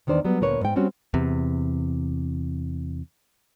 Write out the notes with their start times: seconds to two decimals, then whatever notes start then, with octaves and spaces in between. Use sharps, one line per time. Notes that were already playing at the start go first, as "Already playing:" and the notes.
0.07 E2 D#3 D4 C5 D5
0.25 F#3 G3 B3
0.41 D2 A#2 A#4 B4 C#5
0.61 G#2 G5
0.76 G3 C4 C#4 F#4
1.14 E2 C3